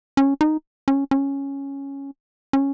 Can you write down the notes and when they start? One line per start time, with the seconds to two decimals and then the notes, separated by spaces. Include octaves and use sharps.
0.17 C#4
0.41 D#4
0.88 C#4
1.11 C#4
2.53 C#4